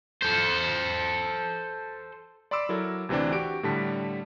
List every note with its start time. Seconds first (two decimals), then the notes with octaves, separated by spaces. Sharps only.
0.23 A4 C5
2.51 D5 B5 C6 D6 E6 D7
2.69 F#3 E4 A4 A#4
3.09 D2 C3 E3 C4 D4
3.32 F#4 G4 D7
3.63 A2 D3 G3 A5 B6